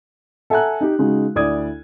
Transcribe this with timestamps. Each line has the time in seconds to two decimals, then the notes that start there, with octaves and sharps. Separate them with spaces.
0.50 A4 E5 F#5 G#5 A#5 F#6
0.81 D#4 G4
0.98 C#3 G#3 D#4 F#4
1.35 D2 E4 D5 D#6 G#6